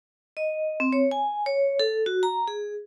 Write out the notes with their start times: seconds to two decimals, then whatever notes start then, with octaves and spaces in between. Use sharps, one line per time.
0.37 D#5
0.80 C4
0.93 C#5
1.11 G#5
1.46 C#5
1.79 A4
2.06 F#4
2.23 A#5
2.48 G#4